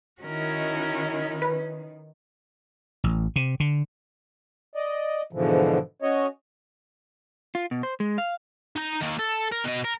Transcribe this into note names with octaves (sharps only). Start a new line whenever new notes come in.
D#3 C#4 E4 F#4 A#4
B4
A1
C3
D3
D5 D#5
G#2 B2 D3 E3 F3
C#4 F#4 C#5 D#5
F4
B2
C5
G#3
F5
D#4 A#5
D#3 A#3
A4
A#4
B2 D#5
A#4